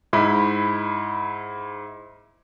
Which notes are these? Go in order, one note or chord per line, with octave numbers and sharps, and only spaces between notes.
G#2 E4 B5